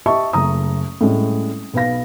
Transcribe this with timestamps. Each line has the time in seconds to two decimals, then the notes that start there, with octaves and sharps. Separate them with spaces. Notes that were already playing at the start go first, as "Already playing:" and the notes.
0.06 G4 D#5 E5 A5 C#6
0.33 F#1 A3 A#5 D#6
1.01 A2 G3 G#3 C#4
1.74 B1 B4 F5 A#6